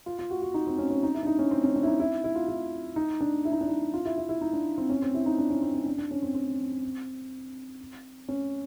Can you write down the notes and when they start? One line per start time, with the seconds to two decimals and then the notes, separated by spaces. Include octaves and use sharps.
0.06 F4
0.19 F4
0.30 F#4
0.42 F#4
0.54 D#4
0.67 C4
0.78 C#4
0.91 C#4
1.03 D#4
1.15 E4
1.23 D4
1.27 D#4
1.39 C#4
1.51 C4
1.64 C#4
1.76 D4
1.83 E4
1.87 D#4
2.00 E4
2.24 E4
2.35 F4
2.48 E4
2.96 D#4
3.21 D4
3.45 E4
3.52 D#4
3.61 D4
3.68 D#4
3.94 F4
4.06 E4
4.18 E4
4.29 E4
4.41 D#4
4.53 D4
4.78 C4
4.89 C#4
5.02 C4
5.14 E4
5.26 D#4
5.38 D4
5.50 C#4
5.62 C4
5.75 C#4
5.86 D4
5.98 D4
6.11 C#4
6.23 C4
6.35 C4
8.28 C#4